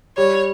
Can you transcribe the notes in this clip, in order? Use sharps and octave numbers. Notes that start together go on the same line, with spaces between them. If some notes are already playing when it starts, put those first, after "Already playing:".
G3 C#5